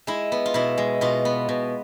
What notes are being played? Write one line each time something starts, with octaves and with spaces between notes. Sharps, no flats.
G#3 E4
B3
F4
B2 E4
G#3
B2 F4
B3
B2